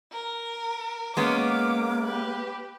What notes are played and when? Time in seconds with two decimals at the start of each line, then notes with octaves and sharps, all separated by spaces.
0.12 A#4
1.17 G#3 A#3 B3 C#4 D6
2.03 G4 B4